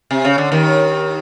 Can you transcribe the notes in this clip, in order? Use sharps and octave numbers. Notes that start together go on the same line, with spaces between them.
C3
C#3
D3
D#2 D#3